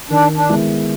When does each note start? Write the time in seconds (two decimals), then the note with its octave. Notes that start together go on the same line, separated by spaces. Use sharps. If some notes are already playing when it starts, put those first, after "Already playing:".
0.10 D#3 D4
0.36 D4
0.49 G#3 B3 E4